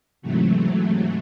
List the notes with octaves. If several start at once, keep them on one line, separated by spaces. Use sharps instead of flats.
G#2 C3 E3 F#3 A3